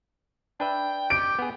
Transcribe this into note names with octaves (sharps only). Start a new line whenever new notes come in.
D4 B4 E5 G5
G4 D7
B3 G#4